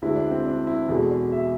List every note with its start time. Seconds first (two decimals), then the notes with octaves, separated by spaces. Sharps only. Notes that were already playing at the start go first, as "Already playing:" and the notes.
0.02 D2 D3 G#3 E4
0.16 D4
0.31 C4
0.46 D4
0.67 E4
0.88 E2 B2 G#3 A4
1.11 D5
1.32 E5